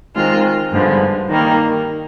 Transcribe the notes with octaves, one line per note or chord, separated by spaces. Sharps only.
D#3 G#3 C4 F4
G2 D3 F3 G#3 B3
D#3 G3 A#3